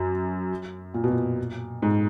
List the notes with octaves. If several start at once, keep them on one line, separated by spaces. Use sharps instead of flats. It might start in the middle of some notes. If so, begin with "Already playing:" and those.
Already playing: F#2
A#2
B2
A#2
G#2